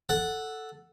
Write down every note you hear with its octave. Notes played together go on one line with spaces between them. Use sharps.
A4 F#5